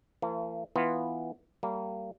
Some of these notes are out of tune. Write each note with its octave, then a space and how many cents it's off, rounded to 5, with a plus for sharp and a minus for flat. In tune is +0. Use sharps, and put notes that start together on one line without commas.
E3 +45 A#3 -45
E3 +0 B3 +0 F4 +0
G3 -30 A#3 -30